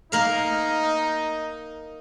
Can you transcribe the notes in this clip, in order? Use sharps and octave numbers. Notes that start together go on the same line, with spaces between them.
A#3 D#4 A#4 F5